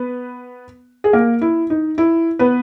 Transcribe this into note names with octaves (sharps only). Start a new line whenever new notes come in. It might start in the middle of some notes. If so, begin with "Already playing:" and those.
Already playing: B3 B4
G#4
A#3 A#4
E4
D#4
E4
B3 B4